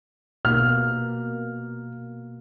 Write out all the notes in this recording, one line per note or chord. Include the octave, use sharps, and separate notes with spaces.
B2 A#3 F6